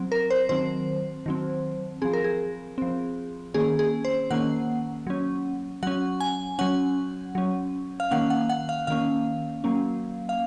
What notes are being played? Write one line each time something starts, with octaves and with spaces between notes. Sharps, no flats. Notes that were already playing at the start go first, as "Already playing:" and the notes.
Already playing: F#3 C4
A#4
C5
D#3 F#3 C4 C5
D#3 F#3 C4
F3 C4 G#4
A#4
G#4
F3 C4
D#3 A#3 C#4 G#4
G#4
C5
D#3 A#3 C#4 F#5
F#3 C#4
F#3 C#4 F#5
G#5
F#3 C#4 F#5
F#3 C#4
F5
D#3 A#3 C#4 F#5
F#5
F#5
F5
D#3 A#3 C#4 F5
F#3 A#3 C#4
F5